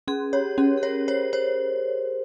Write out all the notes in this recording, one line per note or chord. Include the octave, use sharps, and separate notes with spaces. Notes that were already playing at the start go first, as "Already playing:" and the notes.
C#4 G#4
G4 C#5
C#4 G#4
G#4
A#4 C#5
C5 C#5
C5 C#5